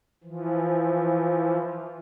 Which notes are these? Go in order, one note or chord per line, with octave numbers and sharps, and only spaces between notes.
E3 F3